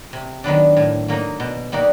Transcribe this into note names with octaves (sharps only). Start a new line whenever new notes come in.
C3
D#3 F#3 B3 D4
A2
F#3 A#3 D#4
B2
G3 A#3 D#4 F#4